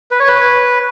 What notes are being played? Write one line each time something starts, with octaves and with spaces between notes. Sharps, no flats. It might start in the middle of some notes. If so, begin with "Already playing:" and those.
B4
C#5
B4